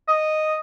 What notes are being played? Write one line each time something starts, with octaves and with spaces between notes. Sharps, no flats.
D#5